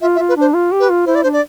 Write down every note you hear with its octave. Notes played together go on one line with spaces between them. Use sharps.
F4 E5
E5
F4
B4
D4 C5
F4
G4
B4
F4
E4 C5
D5
D4 C5
D5